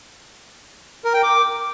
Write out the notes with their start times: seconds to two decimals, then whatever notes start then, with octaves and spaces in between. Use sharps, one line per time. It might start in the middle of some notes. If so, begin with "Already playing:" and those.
1.05 A#4
1.14 G5
1.23 D6